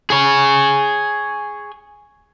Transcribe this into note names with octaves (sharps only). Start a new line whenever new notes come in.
G#4 C#5